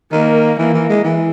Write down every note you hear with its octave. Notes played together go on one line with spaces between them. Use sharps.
D#3 A#3
E3 A#3
E3
G#3
E3